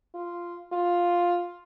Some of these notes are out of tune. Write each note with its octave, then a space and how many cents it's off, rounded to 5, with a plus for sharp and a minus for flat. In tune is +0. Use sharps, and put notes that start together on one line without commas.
F4 -5
F4 +5